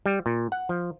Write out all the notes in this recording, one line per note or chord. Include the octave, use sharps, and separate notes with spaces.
G3
A#2
F#5
F3